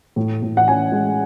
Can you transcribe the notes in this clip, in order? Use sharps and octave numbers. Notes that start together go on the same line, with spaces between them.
A2
A2
F#5
C#4 G#5
G#3